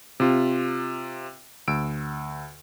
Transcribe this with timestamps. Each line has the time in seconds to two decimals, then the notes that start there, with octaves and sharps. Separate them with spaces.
0.20 C3 F4
1.68 D2 E6 D7